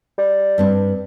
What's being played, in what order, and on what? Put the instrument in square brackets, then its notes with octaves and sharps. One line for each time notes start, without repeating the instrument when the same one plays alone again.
[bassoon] G3
[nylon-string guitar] G2 C4 D4